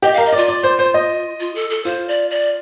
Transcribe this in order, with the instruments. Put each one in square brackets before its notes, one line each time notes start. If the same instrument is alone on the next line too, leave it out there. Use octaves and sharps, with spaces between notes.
[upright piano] G4 [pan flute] D#5
[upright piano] A#4 [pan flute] F5
[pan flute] D#5
[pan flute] F4 [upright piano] D5
[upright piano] D5
C5
C5
D#5
[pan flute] F4
A4
A4
[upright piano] F4 [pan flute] C5
[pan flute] D5
D5